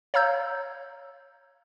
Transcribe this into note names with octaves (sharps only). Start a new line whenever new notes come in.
C#5 F5 A#5 E6 G6 G#6